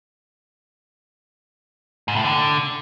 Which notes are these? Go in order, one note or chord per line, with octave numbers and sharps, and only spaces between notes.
G#2
A2
D3